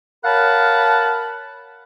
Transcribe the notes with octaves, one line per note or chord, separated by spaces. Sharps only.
A#4 C#5 F5 F#5 A5 B5